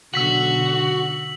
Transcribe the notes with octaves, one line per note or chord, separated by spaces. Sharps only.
B1 D3 F#4 E6 B6 F#7